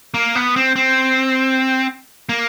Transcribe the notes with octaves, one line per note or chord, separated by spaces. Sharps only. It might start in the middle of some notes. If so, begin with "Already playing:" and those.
A#3
B3
C4
C4
A#3